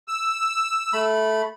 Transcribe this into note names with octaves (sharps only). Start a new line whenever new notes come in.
E6
A3 B5